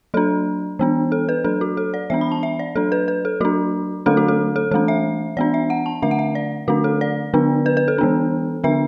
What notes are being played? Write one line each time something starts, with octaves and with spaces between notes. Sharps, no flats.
F#3 D4 A4
E3 B3 D4
A4
B4
F#3 D4 A4
F#4
A4
D5
E3 B3 D4 E5
B5
A5
E5
D5
F#3 D4 A4
B4
B4
A4
F#3 D4 F#4
D3 F#3 A3 D4 A4
F#4
A4
A4
E3 A3 D4 A4
E5
E3 B3 D4 D5
E5
F#5
A5
D3 A3 D4 E5
F#5
E5
D5
D3 A3 D4 F#4
A4
D5
D3 B3 D4
B4
B4
A4
E3 B3 D4
D3 B3 D4 E5